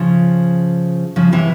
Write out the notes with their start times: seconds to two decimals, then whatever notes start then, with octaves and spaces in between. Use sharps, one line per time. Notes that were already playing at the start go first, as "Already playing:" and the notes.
Already playing: C#3 F3
1.16 C#3 F3
1.32 C3 E3